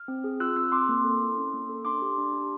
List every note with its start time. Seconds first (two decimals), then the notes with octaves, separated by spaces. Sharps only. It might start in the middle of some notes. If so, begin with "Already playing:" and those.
Already playing: F6
0.08 C4
0.24 G#4
0.40 F4 E6 F#6
0.56 C4 E6 F#6
0.72 C4 C6 D6
0.89 A#3
1.04 A4
1.21 E4
1.36 C#4
1.53 A#3
1.69 A4
1.85 D4 C6 D6
2.02 G4
2.18 D4
2.33 G4